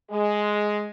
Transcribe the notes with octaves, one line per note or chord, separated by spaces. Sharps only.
G#3